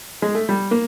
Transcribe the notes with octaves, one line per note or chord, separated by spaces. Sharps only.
G#3
A3
G3
A#3